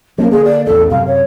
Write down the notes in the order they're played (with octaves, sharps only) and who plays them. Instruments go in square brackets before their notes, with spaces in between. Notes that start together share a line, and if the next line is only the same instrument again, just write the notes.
[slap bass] F3 C#4 [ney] A#3
[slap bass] D3 A#3 [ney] G#4
[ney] D5
[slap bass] A1 E2 [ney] A4
[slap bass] F#2 C3 [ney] F5
[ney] C#5